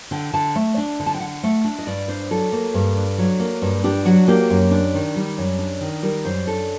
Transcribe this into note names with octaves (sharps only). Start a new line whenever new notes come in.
D3 G5
D3 A5
A3
D4
D3
A5
G5
D3 F#5
A3
D4
D#5
G2 D5
D4 C5
F#3 A4
A#3
G2
D4
F#3
A#3
G2
D4 G4
F#3 F#4
A#3 G4
F#2
D4
D#3
G3
F#2
D4
D#3
G3 A#4
F#2 C5
D4 A4